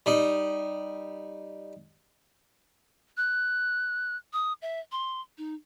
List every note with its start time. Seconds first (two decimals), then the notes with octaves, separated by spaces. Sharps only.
0.06 G3 D#4
3.17 F#6
4.33 D#6
4.62 E5
4.92 C6
5.38 D#4